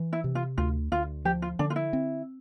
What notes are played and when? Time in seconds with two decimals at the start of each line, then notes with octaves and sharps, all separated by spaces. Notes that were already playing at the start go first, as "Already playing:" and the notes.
Already playing: E3
0.13 E4
0.24 C3
0.35 F4
0.58 D2 F4
0.92 D2 F4
1.25 F3 G4
1.42 F4
1.59 D3 D4
1.70 F4
1.76 E4
1.93 C4